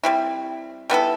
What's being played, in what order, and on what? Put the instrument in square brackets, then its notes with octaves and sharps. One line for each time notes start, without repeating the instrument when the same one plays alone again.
[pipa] G3 C4 E4
G3 B3 E4 A4